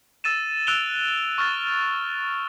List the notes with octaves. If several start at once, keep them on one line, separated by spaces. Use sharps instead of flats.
E6 A6 D#7 E7
E6 F#6 D7 F7 G7
C#6 F6 A6